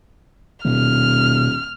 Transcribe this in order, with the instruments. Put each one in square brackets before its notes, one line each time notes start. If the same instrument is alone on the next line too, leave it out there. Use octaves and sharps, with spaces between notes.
[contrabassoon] D#1 [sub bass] B2 [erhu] F6